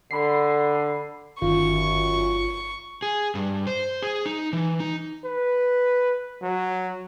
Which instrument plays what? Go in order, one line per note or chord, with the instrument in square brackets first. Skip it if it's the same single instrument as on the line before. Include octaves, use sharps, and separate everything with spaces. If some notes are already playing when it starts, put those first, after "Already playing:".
[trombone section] D3 [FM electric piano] B5 C7
[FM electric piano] G1 D#3 F4 [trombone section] F#2 [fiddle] C#6
[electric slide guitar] G#4
G2
C5
G#4
D#4
E3
D#4
[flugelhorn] B4
F#3